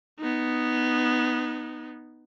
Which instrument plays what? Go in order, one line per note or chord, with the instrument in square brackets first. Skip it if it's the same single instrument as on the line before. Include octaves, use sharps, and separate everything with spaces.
[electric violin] B3 D#4